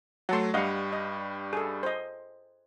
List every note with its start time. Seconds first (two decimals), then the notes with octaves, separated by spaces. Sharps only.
0.29 F#3 A3 F#5 A5 C6
0.54 G2 G3 D#5 F5 F#5
0.93 D#5
1.53 G#4 A4
1.83 C5 D#5